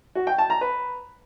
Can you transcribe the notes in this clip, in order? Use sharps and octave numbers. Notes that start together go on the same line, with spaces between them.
F#4
G5
A5
A#5
B4